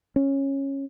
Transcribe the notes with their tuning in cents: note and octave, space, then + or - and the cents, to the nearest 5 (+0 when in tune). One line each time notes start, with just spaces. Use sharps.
C#4 -15